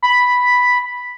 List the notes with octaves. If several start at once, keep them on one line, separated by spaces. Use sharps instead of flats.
B5